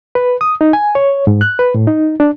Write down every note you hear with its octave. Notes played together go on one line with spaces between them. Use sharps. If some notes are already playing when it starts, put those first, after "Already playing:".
B4
D#6
D#4
G#5
C#5
G#2
F#6
B4
A2
D#4
D4